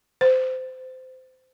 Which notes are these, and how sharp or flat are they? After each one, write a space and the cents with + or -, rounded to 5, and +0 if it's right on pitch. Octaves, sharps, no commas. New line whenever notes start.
C5 -25